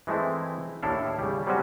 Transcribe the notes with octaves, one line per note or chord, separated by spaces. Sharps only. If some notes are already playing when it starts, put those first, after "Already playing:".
E3 G#3 A3 C4 E4
D#2 A2 D4 E4 A4 F5
C#3 G3
F#3 G3 A3 C4 C#4 F#4